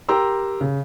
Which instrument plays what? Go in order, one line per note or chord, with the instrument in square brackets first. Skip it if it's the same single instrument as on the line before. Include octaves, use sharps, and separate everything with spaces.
[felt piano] G4 A#4 G5 A#5 C6 E6
C#3